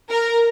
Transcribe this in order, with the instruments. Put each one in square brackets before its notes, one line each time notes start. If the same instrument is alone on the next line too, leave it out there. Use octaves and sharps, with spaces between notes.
[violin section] A#4